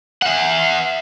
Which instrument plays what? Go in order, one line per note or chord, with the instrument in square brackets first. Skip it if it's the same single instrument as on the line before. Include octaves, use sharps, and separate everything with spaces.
[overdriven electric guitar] E5 F#5